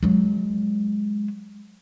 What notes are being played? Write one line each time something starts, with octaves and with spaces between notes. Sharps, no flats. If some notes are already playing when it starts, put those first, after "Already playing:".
F#3 G#3